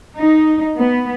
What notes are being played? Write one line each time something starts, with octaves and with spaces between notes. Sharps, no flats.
D#4
B3